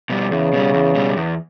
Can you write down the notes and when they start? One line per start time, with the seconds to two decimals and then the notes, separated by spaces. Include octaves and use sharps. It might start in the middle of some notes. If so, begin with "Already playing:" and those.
0.10 B2 G3
0.31 E2 C#3
0.53 B2 G3
0.74 E2
0.95 B2 G3
1.17 E2